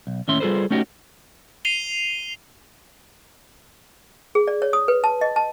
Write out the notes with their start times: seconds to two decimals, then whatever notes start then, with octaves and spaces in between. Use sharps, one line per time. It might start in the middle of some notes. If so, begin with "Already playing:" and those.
0.07 B1
0.28 D#2 A2 C#4 E5 C6
0.40 G3 F4 G#4 A4 B4 C5
0.71 A3 C#4 D#4 F#4 G4
1.65 C7 D#7 F7 G7
4.35 G#4
4.48 D5
4.62 C#5
4.73 D#6
4.88 B4
5.04 A5
5.21 D#5
5.36 A5